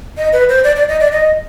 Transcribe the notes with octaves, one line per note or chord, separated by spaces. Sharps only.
D#5
B4
C5
D5
D5
D#5
D5
D#5